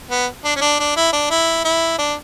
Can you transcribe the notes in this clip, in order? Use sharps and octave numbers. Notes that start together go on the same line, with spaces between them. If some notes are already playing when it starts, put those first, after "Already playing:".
B3
D4
C#4
D4
D4
E4
D4
E4
E4
D4